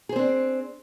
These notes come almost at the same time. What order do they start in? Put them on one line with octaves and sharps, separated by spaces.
G#4 C5 C4 D4